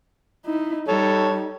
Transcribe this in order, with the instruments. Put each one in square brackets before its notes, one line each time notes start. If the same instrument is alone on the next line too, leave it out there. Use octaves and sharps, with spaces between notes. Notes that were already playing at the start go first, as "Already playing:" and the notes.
[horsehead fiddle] D#4 E4
[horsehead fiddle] G3 D#4 [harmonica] A4 C#5